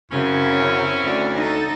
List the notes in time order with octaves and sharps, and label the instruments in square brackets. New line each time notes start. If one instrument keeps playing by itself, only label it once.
[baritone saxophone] F#2 [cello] C#3 [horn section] C4 C#4 E4
[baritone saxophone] D2 [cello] D5
[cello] D#4 A4